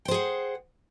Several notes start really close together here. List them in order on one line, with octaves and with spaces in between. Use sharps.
G5 C5 G#4 F#5